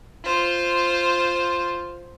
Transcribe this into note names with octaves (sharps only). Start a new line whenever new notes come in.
F4 C5